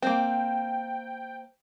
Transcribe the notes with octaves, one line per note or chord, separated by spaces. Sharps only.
A#3 C4 G5